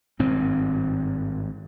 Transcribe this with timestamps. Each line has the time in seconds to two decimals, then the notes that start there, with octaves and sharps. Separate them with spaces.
0.19 G#1 G2 C4